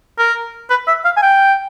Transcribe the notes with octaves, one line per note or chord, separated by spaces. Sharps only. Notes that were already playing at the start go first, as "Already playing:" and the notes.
A#4
B4
E5
F5
G#5
G5